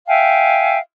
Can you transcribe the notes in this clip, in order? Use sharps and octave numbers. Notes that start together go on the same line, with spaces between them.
E5 F5 G5 G#5